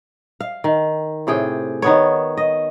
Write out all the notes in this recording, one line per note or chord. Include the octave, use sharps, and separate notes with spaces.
F5
D#3
A2 C3 G#4 G5
D#3 B3 C#5
D#5